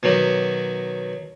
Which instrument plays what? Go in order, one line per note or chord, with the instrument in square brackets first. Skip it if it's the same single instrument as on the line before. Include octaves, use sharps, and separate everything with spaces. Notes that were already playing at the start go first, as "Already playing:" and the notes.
[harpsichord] B2 D#3 F#3 G4